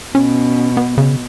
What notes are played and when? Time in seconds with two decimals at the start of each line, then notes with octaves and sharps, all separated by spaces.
0.15 B2 C#4
0.77 B3
0.98 C#3